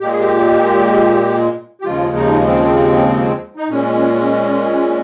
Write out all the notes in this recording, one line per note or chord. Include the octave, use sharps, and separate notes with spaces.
A#2 G#3 G4
G#4
G4
G4
D#2 C#3 F3 G#3 F4
D#4
C4
D#4
A#2 G#3 C#4